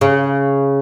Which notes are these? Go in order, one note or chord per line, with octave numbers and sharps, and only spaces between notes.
C#3